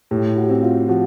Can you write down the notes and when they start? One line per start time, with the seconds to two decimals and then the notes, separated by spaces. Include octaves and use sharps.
0.11 A2 G4
0.36 F#4
0.43 G4
0.49 C4 F#4
0.63 F4
0.88 F3 F#4